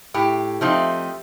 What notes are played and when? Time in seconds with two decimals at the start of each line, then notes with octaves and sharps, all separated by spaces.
0.14 A2 G4
0.61 F3 A3 C4 D#4